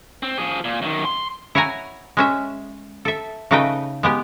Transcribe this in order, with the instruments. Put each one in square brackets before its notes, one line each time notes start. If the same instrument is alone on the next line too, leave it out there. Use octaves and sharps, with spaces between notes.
[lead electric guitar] C4
F3 G#4
A#2
F#2 D#3
C6
[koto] E4 C#5 F#5 G#5 A#5
G#3 C#4 E5
A4 E5
C#3 A3 D#4 B4 D#5 G5
G#3 B3 G4